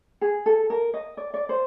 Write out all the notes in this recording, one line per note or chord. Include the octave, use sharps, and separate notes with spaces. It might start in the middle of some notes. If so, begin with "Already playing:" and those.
G#4
A4
A#4
D#5
D5
D5
C5